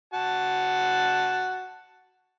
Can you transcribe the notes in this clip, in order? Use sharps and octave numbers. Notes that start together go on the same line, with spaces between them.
F#4 A5